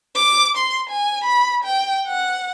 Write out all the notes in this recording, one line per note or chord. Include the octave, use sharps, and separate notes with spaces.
D6
C6
G#5
B5
G5
F#5